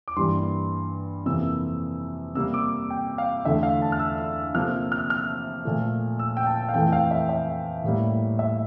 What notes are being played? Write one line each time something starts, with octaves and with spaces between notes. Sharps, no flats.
D6
G2 E3 G3 A#3 C6
F2 C3 E3 A#3 E6
C3 G3 A#3 E6
D6
G5
F5
E2 D3 A3 E5
F5
A5
F6
E6
E6
C3 F3 A#3 F6
F6
F6
A#2 F3 A3
E6
G5
A5
F5
F2 E3 A3 G5
G5
F5
E5
E5
A2 G3 A#3
E5